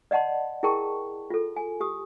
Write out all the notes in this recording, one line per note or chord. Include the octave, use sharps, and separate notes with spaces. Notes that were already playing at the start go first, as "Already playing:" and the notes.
D5 D#5 F#5 A5 C6
E4 G#4 A#4 G5 A5 C#6
F4 A4
G#5
G4 D#6